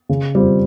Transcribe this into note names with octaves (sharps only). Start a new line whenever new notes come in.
C#3
G3 C4 F4